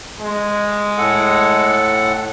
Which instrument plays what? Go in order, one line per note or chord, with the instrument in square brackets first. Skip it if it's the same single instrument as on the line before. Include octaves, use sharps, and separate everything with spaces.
[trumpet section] G#3
[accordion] A2 A4 F#5